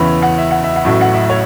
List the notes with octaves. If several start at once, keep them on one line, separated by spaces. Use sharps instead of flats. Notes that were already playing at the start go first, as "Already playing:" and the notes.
Already playing: E2 C#3 E3 C#4 E4 B5
F#5
E5
F#5
E5
F#5
A1 A2 F#3 A3 E5
F#5
E5
C#5